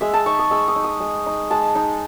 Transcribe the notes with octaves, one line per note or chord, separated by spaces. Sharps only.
G#3 E5
A5
D#4 C#6
D#6
G#3 E6
D#6
D#4
D#6
G#3
D#4
G#3 A5
D#4